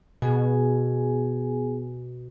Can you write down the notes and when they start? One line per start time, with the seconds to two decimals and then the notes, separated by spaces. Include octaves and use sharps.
0.22 B2 B3 G#4 G#5